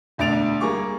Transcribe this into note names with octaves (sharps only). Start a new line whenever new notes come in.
E1 D2 D4 A6 D7 F7
G3 A#3 G#4 C#6 D6